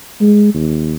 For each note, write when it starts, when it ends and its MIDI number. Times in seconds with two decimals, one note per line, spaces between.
0.20 0.50 56
0.54 0.96 39